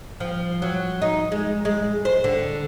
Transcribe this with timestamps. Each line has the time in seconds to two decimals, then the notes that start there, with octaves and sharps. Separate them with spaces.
0.20 F3
0.62 F#3
1.02 D#4
1.32 G#3
1.65 G#3
2.05 C5
2.24 D3